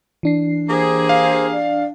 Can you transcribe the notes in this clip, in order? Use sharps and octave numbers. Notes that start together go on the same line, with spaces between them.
E3 D4 C7
A#3 G4 G#4 C5
F5
D5